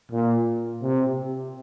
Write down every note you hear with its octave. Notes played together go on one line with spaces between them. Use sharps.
A#2
C3